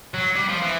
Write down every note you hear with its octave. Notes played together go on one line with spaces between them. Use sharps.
F#3
G3
F3
E3